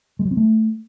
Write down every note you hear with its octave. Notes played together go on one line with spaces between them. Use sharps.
G#3
F#3
C4
A3